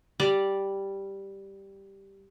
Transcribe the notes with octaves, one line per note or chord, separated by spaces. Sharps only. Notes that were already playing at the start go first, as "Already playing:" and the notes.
G3 D5